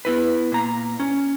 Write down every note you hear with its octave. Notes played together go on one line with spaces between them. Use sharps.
B3 E4 B4
A#2 A#5
C#4